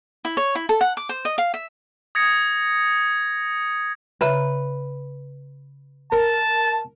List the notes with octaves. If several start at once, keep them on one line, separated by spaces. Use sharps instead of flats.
E4
C#5
E4
A4
F#5
D6
C5
D#5
F5
E5
D#6 G#6 A#6 C#7
C#3 B4 E5 A#5
A#4 A5